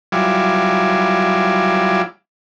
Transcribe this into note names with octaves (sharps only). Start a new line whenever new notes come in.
F#3 G3 E4 F4 G#5 D6